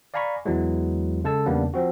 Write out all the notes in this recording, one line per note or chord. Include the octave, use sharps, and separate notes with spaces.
D5 F5 G#5 A#5 B5 C#6
E2 E3 F#3 G#3
C#3 G#3 A4 A5 E6
E2 C#3 G3 A#3 B3 D4
F3 C4 F#4